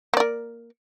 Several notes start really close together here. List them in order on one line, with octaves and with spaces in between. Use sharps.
A#3 D5 A#4